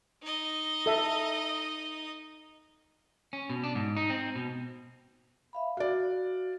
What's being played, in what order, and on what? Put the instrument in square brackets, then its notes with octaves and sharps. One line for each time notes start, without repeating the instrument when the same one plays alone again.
[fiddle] D#4 D#5
[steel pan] A4 E5
[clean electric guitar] C#4
B2
D4
G#2
D#4
C4
B2
[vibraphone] E5 F5 B5
[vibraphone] F#4 [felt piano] D5 F5